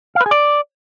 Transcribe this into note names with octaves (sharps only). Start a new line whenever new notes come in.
F5
B4
G#4
D5